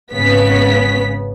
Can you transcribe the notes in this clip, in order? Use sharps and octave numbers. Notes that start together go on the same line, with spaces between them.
G#1 C#3 B3 B6